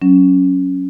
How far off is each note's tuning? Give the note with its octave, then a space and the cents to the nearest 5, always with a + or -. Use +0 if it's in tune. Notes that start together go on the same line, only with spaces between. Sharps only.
F#3 +0 C#4 +0